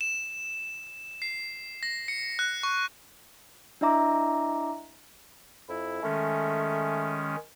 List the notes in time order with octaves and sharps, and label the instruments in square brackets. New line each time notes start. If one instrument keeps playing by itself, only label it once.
[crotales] E7
C7
A#6
C#7
F#6
C#6
[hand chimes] D4 E4 D#5 E5 A#5 D6
[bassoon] F2 [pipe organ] E4
[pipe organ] D#3 G#3 C#4 [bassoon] A3